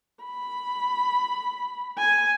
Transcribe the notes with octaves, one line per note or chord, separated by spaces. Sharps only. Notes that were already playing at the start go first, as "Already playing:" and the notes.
B5
G#5